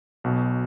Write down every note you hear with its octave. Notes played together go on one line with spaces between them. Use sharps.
B1 B2